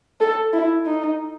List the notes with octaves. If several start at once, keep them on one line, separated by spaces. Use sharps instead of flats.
A4
E4
D#4